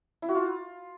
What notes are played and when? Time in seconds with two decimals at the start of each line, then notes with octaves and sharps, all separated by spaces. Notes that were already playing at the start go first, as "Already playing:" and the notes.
0.22 E4
0.29 F#4
0.35 F4